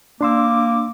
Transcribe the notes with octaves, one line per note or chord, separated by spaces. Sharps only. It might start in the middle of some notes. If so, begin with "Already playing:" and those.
A#3 D4 C6 D6 E6